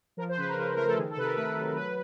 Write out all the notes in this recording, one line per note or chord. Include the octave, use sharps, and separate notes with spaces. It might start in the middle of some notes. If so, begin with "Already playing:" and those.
F3 A#4
C5
C#3 B4
A#4
C#3 B4
A3 A#4
A4
D#3 G#4
A4
C3 B4
A#4
A3 B4
F#3
F#3 B4